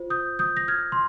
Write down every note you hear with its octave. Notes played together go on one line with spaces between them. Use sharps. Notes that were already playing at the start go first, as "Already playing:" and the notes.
Already playing: F4 C5
D#6 G6
D#6 G6
A#6
F6 G#6
C6